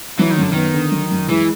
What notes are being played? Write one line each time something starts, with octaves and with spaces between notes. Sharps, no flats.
E3 F#3
D#3
F#2 D3
D#3 B3
D3
F#3
F#2
E3 G#3